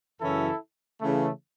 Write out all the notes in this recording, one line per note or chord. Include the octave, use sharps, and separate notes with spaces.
F#2 C#3 E3 C#4 E4 A4
C#3 E3 A3